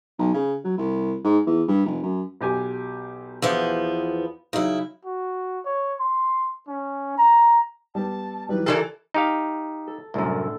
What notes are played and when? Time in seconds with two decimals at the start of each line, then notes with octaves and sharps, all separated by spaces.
0.19 B1
0.34 C#3
0.64 F#3
0.78 C2
1.24 G#2
1.46 E2
1.68 G2
1.85 F1
2.03 F#2
2.41 B1 G4 G#5
3.42 E2 F3 B3
4.53 C#3 F#3 D#4 E4
5.05 F#4
5.65 C#5
6.00 C6
6.68 C#4
7.18 A#5
7.95 G3 B3 A5
8.49 E3 F#3 G3 B4
8.66 E3 F3 G4 A4 A#4 D5
9.14 D#4 G4 F5
9.87 A4
10.14 C2 F#2 A2 D3 A4